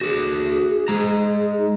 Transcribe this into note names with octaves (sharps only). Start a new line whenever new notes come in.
F#4 G#4 A4
G#3 A#5
D#4